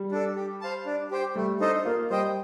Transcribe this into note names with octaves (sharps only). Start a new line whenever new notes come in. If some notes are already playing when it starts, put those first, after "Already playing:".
Already playing: G3
D4 A4
G4
C5 F5 A5
D4
G4 C5 G5
G3 A3
D4 D#4 A4 C5 D#5
A#3 F4
G3 C5 D#5 G5